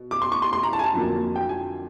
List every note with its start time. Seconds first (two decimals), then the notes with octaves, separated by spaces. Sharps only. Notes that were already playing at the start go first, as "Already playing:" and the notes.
Already playing: B2
0.11 D6
0.22 C6
0.32 C#6
0.42 C6
0.53 C6
0.63 A#5
0.73 A5
0.79 G#5
0.84 A5
0.94 F2 D3 F#3 A#3
1.36 G5
1.49 G#5